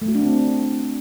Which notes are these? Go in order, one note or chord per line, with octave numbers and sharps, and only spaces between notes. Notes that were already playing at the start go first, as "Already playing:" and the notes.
A3
F#4
D4
C4